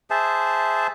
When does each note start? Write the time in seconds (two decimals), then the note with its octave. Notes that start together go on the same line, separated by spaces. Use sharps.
0.10 G#4 C5 E5 A5